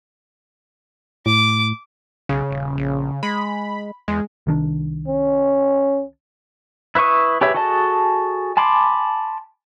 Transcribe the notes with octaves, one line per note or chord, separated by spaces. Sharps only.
A2 D6
B1 C#3
D#1
A#1
G#3 B5
E2 G#3
C2 D#3 D4
C#4
E4 B4 E5 C#6 D#6
G4 G#4 B4 C#5 E5
F#4 G#4 A4 D#5 A5
G#5 A5 B5 C6 D6